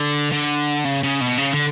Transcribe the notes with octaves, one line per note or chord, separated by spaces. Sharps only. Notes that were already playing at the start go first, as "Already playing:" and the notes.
Already playing: D3
D3
C#3
C#3
B2
C#3
D3